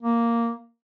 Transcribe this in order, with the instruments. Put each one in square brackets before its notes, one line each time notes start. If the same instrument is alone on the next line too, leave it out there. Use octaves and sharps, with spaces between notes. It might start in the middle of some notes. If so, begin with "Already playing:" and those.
[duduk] A#3